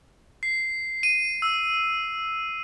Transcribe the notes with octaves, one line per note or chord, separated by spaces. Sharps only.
C7
D#7
E6